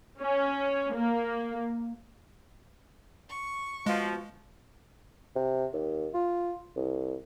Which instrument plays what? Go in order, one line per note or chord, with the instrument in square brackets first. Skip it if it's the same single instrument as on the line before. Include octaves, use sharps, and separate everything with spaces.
[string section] C#4
A#3
[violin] C#6
[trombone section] B2 F3 [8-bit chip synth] G#3
[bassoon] C3
D#2
F4
C2